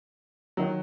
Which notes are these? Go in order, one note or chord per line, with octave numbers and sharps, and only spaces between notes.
D#3 F#3